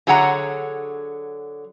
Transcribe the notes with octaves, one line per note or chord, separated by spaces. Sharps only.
D3 F#3 G#4 C#5 F#5 A#5